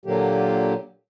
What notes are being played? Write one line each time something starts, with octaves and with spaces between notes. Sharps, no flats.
A#2 D3 F#3 A#3 G4